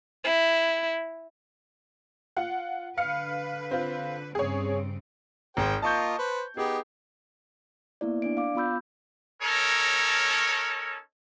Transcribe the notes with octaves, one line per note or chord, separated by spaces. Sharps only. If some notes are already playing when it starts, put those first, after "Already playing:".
E4
F4 F#5
D3 B4 F5 F6 C#7
C4 F4
G2 C#3 C4 G#4 C#5
G#1 G#4 C5 G5
A#3 F4 D#5 A5 C#6 G6
B4 C5
B3 D#4 G4 G#4
A#3 B3 E4 D5
D4 D5 D7
F5 D6
B3 F4 B5 E6 G6
C#4 D#4 A4 A#4 C#5